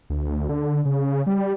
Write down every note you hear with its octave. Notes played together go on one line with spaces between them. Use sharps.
D2
D3
C#3
G3